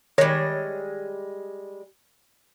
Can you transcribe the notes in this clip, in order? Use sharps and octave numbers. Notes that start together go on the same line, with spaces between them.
D#3 G3 G#3 C#5 A#6